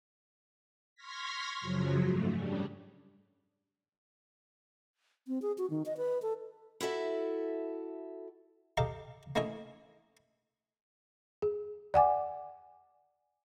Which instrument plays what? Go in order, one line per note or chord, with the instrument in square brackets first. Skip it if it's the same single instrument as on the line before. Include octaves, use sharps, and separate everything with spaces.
[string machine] C6 C#6 F6 G#6 A#6 B6
F#2 C#3 F3 F#3
G#2 A3
C#3 G3 D4
[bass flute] C4
G#4
F#4
D#3
D#5
B4
A4
[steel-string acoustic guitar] E4 F#4 A4 E5
[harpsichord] G4 A4 D#5 F5 A#5
A3 A#3 C#4 E4 D#5 G#5
[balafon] G#4
D5 F#5 G#5 D6